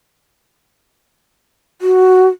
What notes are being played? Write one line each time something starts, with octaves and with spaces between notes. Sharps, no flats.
F#4